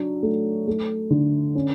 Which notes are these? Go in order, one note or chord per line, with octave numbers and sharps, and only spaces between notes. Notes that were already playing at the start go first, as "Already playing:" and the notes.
Already playing: F#3 D4
A3
A3
D3
C#4